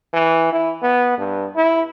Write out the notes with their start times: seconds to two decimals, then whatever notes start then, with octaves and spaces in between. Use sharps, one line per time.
0.14 E3
0.53 E4
0.82 B3
1.18 G2
1.56 E4